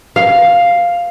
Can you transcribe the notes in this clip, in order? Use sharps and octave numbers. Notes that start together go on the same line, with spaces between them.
F5